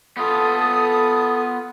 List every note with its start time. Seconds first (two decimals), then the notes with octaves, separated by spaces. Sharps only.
0.17 B3 F4 A4 D#6